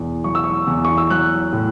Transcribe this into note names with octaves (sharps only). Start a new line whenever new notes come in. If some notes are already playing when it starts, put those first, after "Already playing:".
Already playing: E2 B2
F#3 C#6
E6
C#6
E2
C#6
E6
F#3 F#6
A2